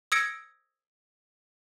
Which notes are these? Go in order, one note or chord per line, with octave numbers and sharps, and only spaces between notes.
D#6 E6 G#6 A#6 C#7 D7